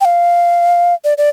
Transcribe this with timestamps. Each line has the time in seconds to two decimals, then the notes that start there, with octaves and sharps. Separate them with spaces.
0.01 G5
0.05 F5
1.04 D5
1.18 D5